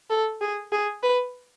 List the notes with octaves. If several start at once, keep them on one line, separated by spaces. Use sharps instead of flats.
A4
G#4
G#4
B4